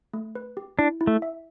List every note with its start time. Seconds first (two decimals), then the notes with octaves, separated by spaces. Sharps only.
0.13 A3
0.35 B4
0.57 G4
0.79 D4 E4
1.01 E4
1.07 A3
1.22 E5